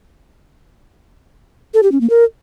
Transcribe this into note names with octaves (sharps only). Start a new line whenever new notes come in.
A4
G4
C#4
A#3
A#4